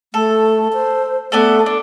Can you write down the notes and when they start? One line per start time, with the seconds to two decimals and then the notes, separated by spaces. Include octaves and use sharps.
0.14 A3 A4
0.73 C5
1.32 A3 B3 D4 A4
1.66 D4